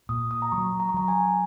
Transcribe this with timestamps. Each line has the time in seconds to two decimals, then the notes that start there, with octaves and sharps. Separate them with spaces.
0.09 A#2 D#6
0.31 D#6
0.42 A#5
0.52 F#3 C#6
0.80 A#5
0.89 C#6
0.94 F#3 A#5
1.08 G#5